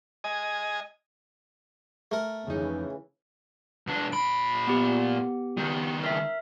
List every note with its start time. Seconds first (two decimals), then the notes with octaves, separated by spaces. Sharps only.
0.24 D#5 G#5
2.11 A3 A#4
2.47 F2 C#3 E3 D#4
3.87 B2 D4
4.12 A#2 B5 D7
4.67 B3 G4
5.57 C#2 D#3
6.04 A#4 E5